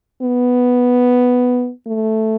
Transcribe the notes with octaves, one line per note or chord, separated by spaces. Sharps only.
B3
A3